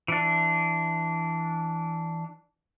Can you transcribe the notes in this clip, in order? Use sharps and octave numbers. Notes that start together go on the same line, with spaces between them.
E3 D4